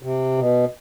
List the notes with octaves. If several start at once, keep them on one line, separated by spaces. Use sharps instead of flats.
C3
B2